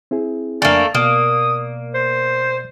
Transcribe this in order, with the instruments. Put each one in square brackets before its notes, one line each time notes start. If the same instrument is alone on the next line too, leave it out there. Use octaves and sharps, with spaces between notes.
[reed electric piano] C4 E4 G#4
[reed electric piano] F2 D4 G#5 [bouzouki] A3 A#3 [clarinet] D5
[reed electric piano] B2 D5 F6 [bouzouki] A#3 [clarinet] D#6
[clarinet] C5